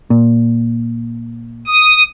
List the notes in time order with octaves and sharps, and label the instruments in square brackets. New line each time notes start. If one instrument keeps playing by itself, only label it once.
[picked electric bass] A#2
[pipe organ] D#6